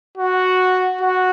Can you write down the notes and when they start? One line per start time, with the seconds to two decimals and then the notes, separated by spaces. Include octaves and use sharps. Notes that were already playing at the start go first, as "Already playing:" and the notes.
0.17 F#4
1.01 F#4